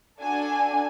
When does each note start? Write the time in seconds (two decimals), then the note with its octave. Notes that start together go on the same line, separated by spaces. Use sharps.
0.20 D4 F#4 A4 G#5